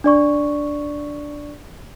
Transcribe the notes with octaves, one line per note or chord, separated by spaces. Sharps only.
D4 D5 C#6